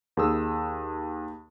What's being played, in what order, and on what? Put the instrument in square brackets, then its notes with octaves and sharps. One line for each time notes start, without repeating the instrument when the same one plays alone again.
[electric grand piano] D#2 G#4 D#6 E6